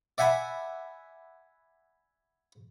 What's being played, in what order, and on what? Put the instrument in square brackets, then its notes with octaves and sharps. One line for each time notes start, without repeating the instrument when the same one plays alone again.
[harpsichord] D5 E5 F#5 G#5 B5